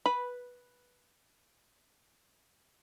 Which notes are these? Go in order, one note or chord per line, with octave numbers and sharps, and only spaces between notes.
B4 B5